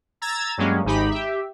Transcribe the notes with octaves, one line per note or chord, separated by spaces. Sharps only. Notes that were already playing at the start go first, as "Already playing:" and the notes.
A#5 E6 G#6 A6
G2 F#3 G#3 A#3 C#4
G#1 G#2 D#4 G4 B5
G4 E5